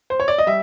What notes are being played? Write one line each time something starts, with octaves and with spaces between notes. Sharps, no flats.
C5
C#5
D5
D#5
G3 E5